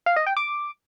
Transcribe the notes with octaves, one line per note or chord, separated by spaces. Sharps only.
F5
D#5
G5
D6